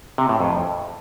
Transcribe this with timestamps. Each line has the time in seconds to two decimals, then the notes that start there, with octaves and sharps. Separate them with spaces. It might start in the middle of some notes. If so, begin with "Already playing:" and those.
0.18 C3
0.29 A2
0.40 F2